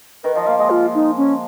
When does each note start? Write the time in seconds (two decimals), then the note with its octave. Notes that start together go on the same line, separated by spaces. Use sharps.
0.24 D#3 B4
0.35 F3 D#5
0.47 A#3 F5
0.59 G#3 D#5
0.70 F4
0.95 D#4
1.17 C#4